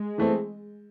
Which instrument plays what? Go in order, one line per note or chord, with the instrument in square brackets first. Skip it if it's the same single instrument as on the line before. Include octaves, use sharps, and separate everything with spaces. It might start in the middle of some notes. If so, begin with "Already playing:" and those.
Already playing: [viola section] G#3
[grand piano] E3 A3 C4